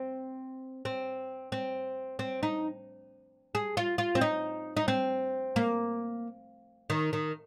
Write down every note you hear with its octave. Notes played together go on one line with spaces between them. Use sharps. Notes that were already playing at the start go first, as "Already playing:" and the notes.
Already playing: C4
C4
C4
C4
D#4
G#4
F4
F4
C4
D#4
D#4
C4
A#3
D#3
D#3